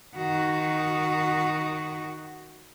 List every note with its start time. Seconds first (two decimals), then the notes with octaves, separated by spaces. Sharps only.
0.17 D#3 F#4